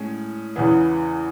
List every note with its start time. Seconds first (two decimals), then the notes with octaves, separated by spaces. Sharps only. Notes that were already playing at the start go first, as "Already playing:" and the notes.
Already playing: A2 G#3 C#4
0.56 E2 C#3 E3 B3